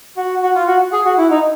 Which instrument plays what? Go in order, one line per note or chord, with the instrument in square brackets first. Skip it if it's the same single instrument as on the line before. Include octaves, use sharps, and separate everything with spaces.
[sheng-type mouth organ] F#4
F#4
F4
F#4
G#4
F#4
E4
D#4